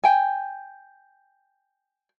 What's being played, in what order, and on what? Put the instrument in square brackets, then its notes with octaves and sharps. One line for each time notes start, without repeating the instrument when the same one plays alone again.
[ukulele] G5 G#5